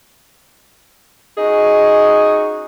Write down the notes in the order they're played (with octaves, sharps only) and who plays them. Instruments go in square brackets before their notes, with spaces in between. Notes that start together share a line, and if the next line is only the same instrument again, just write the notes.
[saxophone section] C#4 D#4 F#4 G#4 D#5